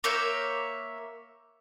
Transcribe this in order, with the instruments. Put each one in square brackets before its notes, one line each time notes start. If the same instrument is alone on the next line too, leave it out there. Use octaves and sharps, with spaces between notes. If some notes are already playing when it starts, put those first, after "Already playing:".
[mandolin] A#3 C#5 E5 G6